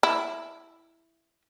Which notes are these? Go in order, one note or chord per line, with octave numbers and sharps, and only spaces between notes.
E4